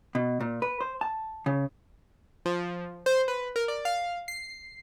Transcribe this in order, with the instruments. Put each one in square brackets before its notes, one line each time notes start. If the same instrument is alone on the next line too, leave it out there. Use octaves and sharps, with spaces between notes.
[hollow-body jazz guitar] B2
A#2
B4
C5
A5
C#3
[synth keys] F3
C5
B4
A#4
D5
F5
C7